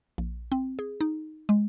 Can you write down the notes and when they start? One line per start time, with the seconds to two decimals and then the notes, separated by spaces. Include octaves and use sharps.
0.18 A#1
0.52 C4
0.79 G#4
1.01 D#4
1.49 G#3